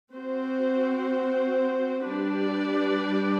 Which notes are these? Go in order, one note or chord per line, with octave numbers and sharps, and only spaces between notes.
C4 F#4 C5
G3 D4 G4 B4 D5